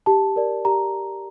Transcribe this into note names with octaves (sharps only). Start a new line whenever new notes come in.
G4 A5
A#4 D5
G4 A#5